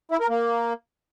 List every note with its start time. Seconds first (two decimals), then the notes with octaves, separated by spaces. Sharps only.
0.11 E4
0.20 A#4
0.29 A#3